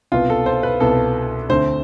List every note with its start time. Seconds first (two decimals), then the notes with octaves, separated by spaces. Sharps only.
0.12 C2 B2 B3 F4
0.30 A4
0.46 C5
0.63 B4
0.80 C2 B2 B3 A4
1.49 D2 D3 A3 C4 C5